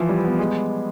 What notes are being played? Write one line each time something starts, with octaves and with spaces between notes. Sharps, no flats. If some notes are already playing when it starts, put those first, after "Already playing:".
Already playing: E3 F3 E4
G3
B3
G#3